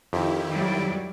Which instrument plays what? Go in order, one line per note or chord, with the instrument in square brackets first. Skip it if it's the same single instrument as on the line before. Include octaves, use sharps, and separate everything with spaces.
[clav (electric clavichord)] F2 [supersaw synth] D#3 E4 G4
[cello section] F#3 G3